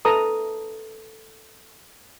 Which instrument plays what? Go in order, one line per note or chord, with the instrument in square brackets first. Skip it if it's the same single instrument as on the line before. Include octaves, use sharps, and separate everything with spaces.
[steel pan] A4 B4 A#5 D#6